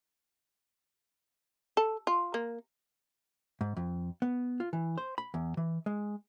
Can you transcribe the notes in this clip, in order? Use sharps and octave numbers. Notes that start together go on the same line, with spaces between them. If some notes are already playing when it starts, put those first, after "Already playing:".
A4
F4
A#3
G#2
F2
B3
F4
E3
C5
B5
E2
E3
G#3